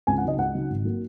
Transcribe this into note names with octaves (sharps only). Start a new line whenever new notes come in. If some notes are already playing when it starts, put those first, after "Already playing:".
C#2 G#5
F#5
C#3 F#3 D#4 D#5
C#2 F#5
C#3 F#3 D#4
G#1
F#3 A#3